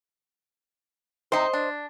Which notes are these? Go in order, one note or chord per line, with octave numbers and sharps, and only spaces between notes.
C3 D#4 C5 D#5
D4